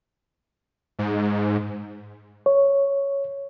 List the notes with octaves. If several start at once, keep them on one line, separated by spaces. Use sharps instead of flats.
G#2
C#5